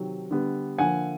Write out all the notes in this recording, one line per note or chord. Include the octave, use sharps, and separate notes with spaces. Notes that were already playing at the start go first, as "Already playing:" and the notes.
Already playing: C3 D#3 F#3
D3 G3 B3
D3 F3 A#3 F#5 G#5